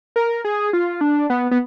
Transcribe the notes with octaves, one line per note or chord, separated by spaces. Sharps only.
A#4
G#4
F4
D4
B3
B3